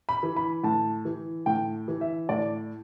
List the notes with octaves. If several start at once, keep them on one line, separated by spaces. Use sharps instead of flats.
B5
E3
B5
A2 A5
E3
A2 G5
E3
E5
A2 D5